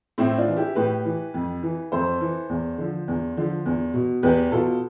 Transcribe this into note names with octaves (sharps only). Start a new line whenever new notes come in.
A2 C4 E4
D4 F4
E3
E4 G4
A2 G4 B4
E3
F2
E3
F2 A4 C5
E3
E2
D3 F3
E2
D3 F3
E2
B2
E2 G4 B4
B2 F4 A4